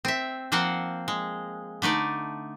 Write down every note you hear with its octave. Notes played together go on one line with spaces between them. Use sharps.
C4 E5
F3 A#3 C4 C5 F#5
G#3
D3 A3 D#4 D5